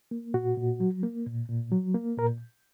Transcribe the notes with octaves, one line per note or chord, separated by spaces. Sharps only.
A#3
A#2 F#4
A#2
F#3
A#3
A#2
A#2
F#3
A#3
A#2 A#4